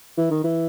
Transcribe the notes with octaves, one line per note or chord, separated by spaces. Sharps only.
E3
D#3
E3